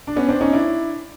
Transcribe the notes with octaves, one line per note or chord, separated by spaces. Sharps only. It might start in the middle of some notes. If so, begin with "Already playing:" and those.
D4
B3 C#4
C4 D4
C#4 D#4
D4 E4